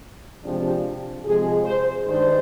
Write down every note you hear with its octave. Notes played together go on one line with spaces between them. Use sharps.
C3 F3 G#3 D4 G4
C3 F3 G#3 G#4
C5
G2 D#3 G#3 D4 C5